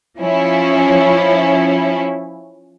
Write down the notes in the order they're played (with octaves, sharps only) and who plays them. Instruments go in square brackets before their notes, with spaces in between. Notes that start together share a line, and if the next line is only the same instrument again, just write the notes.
[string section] F3 C#4 E4